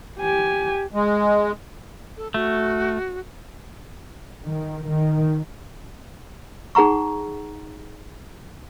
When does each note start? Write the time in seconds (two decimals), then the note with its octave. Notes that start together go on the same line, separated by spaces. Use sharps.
0.20 G4 G#5
0.94 G#3
2.17 A4
2.34 A3 F#4
4.43 D#3
4.87 D#3
6.75 D#4 G#4 F#5 A#5 C#6